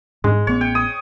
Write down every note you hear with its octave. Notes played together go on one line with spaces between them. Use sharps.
G#2 G#3
A1 B3 C#5
G5
D#6